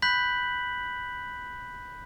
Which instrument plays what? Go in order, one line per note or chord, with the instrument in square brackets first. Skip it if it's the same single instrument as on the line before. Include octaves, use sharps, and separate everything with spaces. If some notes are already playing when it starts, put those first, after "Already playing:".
[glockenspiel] B5 F#6 G6 B6 F#7